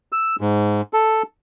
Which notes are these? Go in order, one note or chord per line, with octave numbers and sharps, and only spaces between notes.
E6
G#2
A4